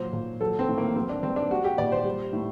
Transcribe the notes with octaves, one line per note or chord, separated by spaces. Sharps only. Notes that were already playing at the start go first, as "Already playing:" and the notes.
Already playing: A#2 F#3 C5
A#2
F#3 A4
C4
A2
A#3
F#3 C4
D4
G2 C4
D4
G3 F#4
G4
A#2 D5
C5
G3
A2